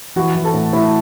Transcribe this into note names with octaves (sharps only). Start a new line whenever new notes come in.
E3 F#4
E3
A4
A2
A2 E4